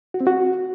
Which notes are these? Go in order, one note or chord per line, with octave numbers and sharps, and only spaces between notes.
F#4
C4
F#4